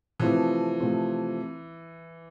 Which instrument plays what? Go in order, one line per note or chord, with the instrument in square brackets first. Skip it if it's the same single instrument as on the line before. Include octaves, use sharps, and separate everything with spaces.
[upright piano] C3 F3 A3 C4 [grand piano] E3
[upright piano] C3 F3 A3 C4